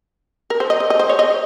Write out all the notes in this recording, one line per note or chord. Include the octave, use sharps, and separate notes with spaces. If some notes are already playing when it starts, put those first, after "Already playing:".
A#4
C5
D#5
D#5
D#5
C5
C#5
D#5